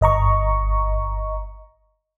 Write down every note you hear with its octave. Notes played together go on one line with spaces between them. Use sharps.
G1 D#5 A#5 C#6